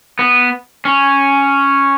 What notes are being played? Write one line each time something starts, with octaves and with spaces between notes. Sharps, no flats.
B3
C#4